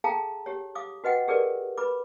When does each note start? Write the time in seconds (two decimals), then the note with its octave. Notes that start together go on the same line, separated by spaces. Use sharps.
0.04 G#4 A4 F5 G5 A5 A#5
0.46 G4 C#5
0.75 F5 D6 D#6
1.04 F#4 B4 D#5 F#5 G5
1.28 G4 G#4 A#4 B4 D5
1.78 B4 B5 D6